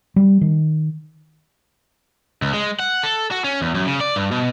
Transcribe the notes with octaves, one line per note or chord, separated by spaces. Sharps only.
G3
D#3
C#2
G#3
F#5
A4
F#4
C#4
E2
F#2
C#3
D5
G2
B2